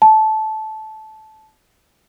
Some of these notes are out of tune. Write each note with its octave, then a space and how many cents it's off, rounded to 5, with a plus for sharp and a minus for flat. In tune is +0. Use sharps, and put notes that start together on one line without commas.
A5 -15